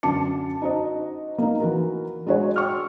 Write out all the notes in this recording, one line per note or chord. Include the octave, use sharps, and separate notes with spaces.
F#2 D3 A5 D6 C#7
D#4 F#4 C5 D#5
A#3 D#4
E3 F#4 A#4
G#3 D4 F#4 G#4 C#5
G5 C#6 E6 F6